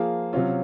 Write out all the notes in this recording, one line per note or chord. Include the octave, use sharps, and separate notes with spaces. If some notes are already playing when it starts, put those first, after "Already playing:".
Already playing: F3 A#3 F4 G#4
C3 F#3 C#4 F4